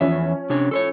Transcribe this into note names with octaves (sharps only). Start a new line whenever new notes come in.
E2 F3 C#4 E5
C3 D4 C#5
A4 C5 C#5